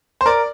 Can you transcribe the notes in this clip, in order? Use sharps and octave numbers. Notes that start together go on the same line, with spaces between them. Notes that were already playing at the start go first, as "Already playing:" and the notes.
C5
A#4 D5